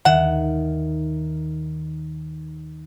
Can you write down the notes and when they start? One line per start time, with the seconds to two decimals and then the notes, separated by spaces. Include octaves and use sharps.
0.05 D#2 D#3 E5 F#5